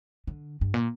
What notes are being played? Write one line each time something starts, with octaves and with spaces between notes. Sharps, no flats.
D3
G2
A#2